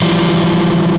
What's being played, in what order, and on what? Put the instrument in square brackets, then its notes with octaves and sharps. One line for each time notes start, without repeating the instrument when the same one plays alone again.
[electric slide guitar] E3 F3 G3